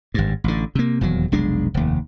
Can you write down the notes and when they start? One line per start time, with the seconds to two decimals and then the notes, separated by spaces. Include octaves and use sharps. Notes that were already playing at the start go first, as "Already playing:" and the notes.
0.14 G#1 G2
0.44 A1 D3
0.75 C3 A#3
1.01 D#1 E2 F#3
1.32 F1 B1 G#3 D4
1.74 F1 D#2